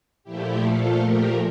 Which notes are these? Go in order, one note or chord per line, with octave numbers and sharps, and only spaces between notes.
A#2 F3 A3 E4 G4
F4 A4
G4 A#4